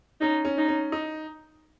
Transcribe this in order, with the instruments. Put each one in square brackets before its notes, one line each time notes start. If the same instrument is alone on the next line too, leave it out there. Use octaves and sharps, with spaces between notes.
[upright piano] C#4 [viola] D#4
[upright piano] C#4
[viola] D#4
[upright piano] C#4
D#4